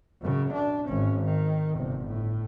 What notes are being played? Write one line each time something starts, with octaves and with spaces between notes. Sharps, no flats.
F#2 C#3
D4
G#1 C#4
D#3
G1 C3
A2